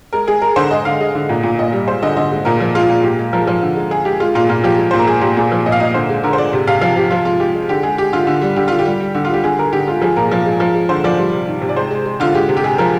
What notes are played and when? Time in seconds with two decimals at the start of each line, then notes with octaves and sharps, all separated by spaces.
0.13 G#3 A#4
0.28 G#3 G#4
0.42 G#3 A#4
0.56 D3 C5
0.71 G#3 D#5
0.85 D3 F5
1.00 G#3 D#5
1.15 D3
1.29 A#2
1.43 A#2
1.59 A#2 D#5
1.72 G3
1.87 G#3 C5
2.02 D3 D#5
2.17 D3 D#5
2.31 G#3
2.45 A#2 A#4
2.60 F3
2.75 G#3 F4
2.90 A#2
3.04 A#2 G4
3.19 G#3
3.33 F3 A#4
3.47 F3
3.62 D3
3.76 G#3
3.90 G#3 G#4
4.05 G#3 G4
4.20 G#3 F4
4.35 A#2 F4
4.49 A#2 F4
4.64 F3 G4
4.78 G#3
4.91 A#2 C5
4.99 A#4
5.07 G#3 G#4
5.21 A#2 G4
5.37 A#2 G#4
5.52 F3
5.66 A#2 D#5
5.72 F5
5.80 A#2 D#5
5.94 D3 C5
6.09 G#3
6.23 D3 A#4
6.33 C5
6.38 G#3 D5
6.53 C3
6.67 C3 F5
6.81 F3 F5
6.96 C3 G4
7.11 F3 F4
7.25 G#3 F4
7.40 G#3 G4
7.55 G#3
7.69 D3 G4
7.83 G#3 G#4
7.98 G#3 G4
8.13 D3 F4
8.27 D3
8.41 G3
8.56 D3 G4
8.68 D3 F4
8.79 G4
8.86 G3
9.00 G3
9.15 D3
9.25 F4
9.30 G3 G4
9.44 D3 G#4
9.58 D3 A#4
9.73 D3 G4
9.87 G#3 F4
10.02 F3 G#4
10.16 A#2 A#4
10.31 F3
10.46 G#3
10.60 F3
10.75 G#3
10.89 D3 C5
11.04 F3 D5
11.18 G3
11.34 C3
11.47 D#3
11.62 C3
11.69 D5
11.76 G#3 C5
11.91 G#3
12.06 G#3
12.20 D3 F4
12.35 G#3 G4
12.49 C3
12.57 G4
12.64 G#3 G#4
12.78 F3 A#4